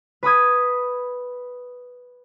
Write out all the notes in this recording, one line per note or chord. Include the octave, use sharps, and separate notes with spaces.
B4 B5 D#6 G#6